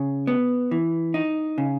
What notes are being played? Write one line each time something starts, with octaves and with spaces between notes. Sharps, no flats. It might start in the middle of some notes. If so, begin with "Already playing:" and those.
Already playing: C#3
B3
E3
D#4
C#3